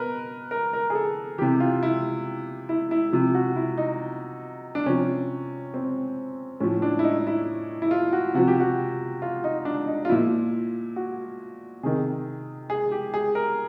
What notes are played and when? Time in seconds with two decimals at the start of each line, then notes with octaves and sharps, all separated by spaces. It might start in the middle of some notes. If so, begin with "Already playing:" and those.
Already playing: B2 A#4 B4
0.51 A#4
0.73 A#4
0.90 G#4
0.95 A4
1.38 C3 E3 G4
1.60 F4
1.83 E4
2.69 E4
2.91 E4
3.13 C3 F3
3.35 F#4
3.56 E4
3.78 D#4
4.75 D4
4.86 C3 F3 C#4
5.74 C4
6.60 A2 F3 C#4
6.82 D4
6.99 E4
7.04 D#4
7.27 E4
7.82 E4
7.91 F4
8.13 F#4
8.34 C3 F3 F#4
8.47 G4
8.60 F#4
9.22 F4
9.44 D#4
9.65 D4
9.87 D#4
10.05 F4
10.09 A#2 F3 E4
10.96 F#4
11.83 C3 D#3 G#4
12.70 G#4
12.91 G4
13.14 G#4
13.35 A#4